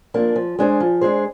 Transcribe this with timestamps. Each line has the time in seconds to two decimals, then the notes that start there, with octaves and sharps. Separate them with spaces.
0.14 F3 A#3 D4
0.36 F3
0.59 G#3 D4 G#4 C5
0.80 F3
1.01 G#3 D4 G#4 C5